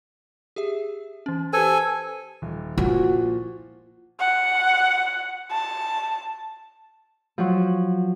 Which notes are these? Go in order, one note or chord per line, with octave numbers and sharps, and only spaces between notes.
G4 G#4 E5
E3 C#4
G4 A4 B4 C5 G#5
D#1
A#2 F3 E4 F#4
F#5
A5
F3 F#3